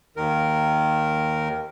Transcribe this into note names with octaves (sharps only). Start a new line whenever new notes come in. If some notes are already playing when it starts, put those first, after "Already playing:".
D#2 D#3 A#4